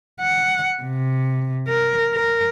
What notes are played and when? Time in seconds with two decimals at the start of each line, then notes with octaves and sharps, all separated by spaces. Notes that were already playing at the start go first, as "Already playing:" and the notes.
0.20 F#5
0.83 C3
1.68 A#4
2.14 A#4